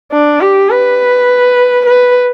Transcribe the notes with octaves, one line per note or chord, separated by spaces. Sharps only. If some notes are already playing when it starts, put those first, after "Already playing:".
D4
G4
B4
B4